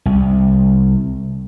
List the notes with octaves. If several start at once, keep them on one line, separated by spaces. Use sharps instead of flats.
C2